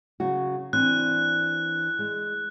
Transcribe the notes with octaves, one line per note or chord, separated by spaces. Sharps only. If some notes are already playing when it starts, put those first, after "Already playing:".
C#3 F#3 F#4
E3 C4 D4 F#6
G#3